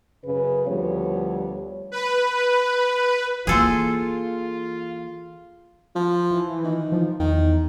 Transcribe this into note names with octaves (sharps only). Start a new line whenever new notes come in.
F#2 C#3 B4
D2 F3 G3 B3 C#5
B4
E3 A#3 F4 G#4 A4 C5
F3
E3
D#3
F3
E2 D#3